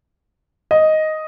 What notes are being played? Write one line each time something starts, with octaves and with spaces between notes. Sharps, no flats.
D#5